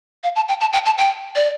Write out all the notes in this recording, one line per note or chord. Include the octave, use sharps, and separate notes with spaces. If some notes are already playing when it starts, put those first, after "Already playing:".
F5
A5
G5
A5
G5
A5
G5
D5